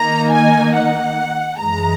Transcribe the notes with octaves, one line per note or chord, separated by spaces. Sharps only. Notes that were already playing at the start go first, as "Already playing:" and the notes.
Already playing: D#3 A#3 D#4 A#5
G#5
F#5
F#2 E3 G#3 A#5